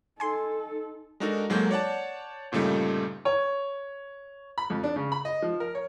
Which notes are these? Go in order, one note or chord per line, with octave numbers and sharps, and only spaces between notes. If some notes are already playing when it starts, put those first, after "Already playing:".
D#4 A4 G#5 C6
G#3 D4 D#4 F#4 A4 A#4
G#2 F#3 G#3 A#3 A4 G6
C#5 D5 F#5 A5
G1 A#2 C#3 G3 A3 D#4
C#5
B5
F2
D4
C#3
B5
D#5
F3
A#4
C#5